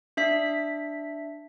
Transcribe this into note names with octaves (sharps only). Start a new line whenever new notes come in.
D4 E5 B6